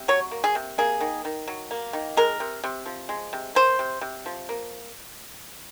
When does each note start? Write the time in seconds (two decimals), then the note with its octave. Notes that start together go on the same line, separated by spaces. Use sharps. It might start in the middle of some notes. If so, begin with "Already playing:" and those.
Already playing: C3
0.08 F#3 C#5
0.31 A#3
0.44 G#4
0.55 C3
0.78 A#3 G#4
1.01 D#3
1.25 D#3
1.48 F#3
1.71 A#3
1.93 D#3
2.17 G#3 A#4
2.40 C3
2.64 C3
2.86 F3
3.09 G#3
3.33 C3
3.55 A#3 C5
3.79 C3
4.01 C3
4.26 F3
4.49 A#3